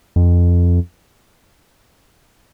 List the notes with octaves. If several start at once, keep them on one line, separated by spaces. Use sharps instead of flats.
F2